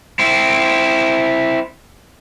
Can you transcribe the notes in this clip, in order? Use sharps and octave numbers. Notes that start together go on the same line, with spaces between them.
C4 E4